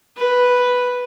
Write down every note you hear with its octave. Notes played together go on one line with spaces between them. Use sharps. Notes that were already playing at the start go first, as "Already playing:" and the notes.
B4